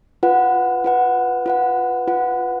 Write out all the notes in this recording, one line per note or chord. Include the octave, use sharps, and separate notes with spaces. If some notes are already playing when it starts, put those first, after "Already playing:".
F4 B4 F#5
F4 B4 F#5
F4 B4 F#5
F4 B4 F#5